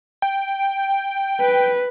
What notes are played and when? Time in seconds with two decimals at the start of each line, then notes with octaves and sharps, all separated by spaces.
0.22 G5
1.41 B4